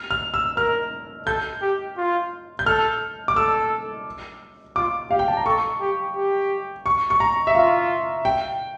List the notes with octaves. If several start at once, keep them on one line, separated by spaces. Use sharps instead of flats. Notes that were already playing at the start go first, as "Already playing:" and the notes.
Already playing: F6
F6
E6
A#4 F6
A4 G6
G4
F4
G6
A4 F6
D6
A4 E6
F4 D6
G4 F5
G5
A5
A#5
A4 C#6
G4
G4
C#6
C#6
A#5
E5
F4 F5
G5